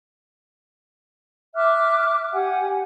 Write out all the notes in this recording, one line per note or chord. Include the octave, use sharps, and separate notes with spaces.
E5 D6 F6 F#6
G4 F#5 G#5